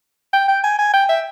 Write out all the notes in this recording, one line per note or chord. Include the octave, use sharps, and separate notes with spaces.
G5
G5
G#5
G#5
G5
E5